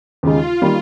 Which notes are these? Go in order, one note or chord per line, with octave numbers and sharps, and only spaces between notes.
D#2 C#3 G#3 D#4 F4
D#3 G3 A#3